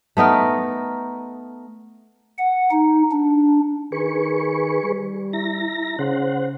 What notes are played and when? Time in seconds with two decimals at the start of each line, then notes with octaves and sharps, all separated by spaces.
0.17 A3 B3 D#4 A#4
2.38 F#5
2.71 D#4
3.11 D4
3.92 D#3 G#4 B4 C#6
4.83 G3
5.33 E4 A#5 A#6
5.99 C#3 C5 F#5